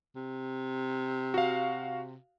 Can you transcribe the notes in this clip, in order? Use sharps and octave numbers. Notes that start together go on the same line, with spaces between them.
C3
F#4 F5